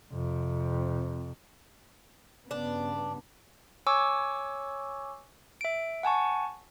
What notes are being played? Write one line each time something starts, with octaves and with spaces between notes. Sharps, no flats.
F2 C3
G2 C#3 B3 D4
C#5 G#5 C#6 D6 E6
E5 D7
F#5 G#5 A5 C#6